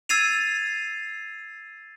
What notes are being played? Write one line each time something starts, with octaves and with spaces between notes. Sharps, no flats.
E6 G#6 A6 C7 D#7 F7